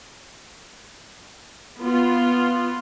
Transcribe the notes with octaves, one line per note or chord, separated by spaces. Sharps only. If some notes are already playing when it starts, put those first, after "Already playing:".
B3 F4